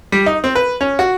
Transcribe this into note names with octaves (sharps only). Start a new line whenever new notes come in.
G3
D#4
C4
B4
C#4
F#4